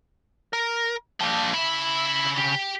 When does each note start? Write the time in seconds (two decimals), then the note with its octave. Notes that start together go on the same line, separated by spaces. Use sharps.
0.53 A#4
1.21 F3 A#3 D4 G5
1.54 C#3 E4 E5 B5
2.38 G4